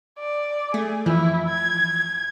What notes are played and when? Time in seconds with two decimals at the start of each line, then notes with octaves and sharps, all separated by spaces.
0.19 D5
0.74 A3 G#4
1.06 F2 E3 F3 E4
1.48 G#6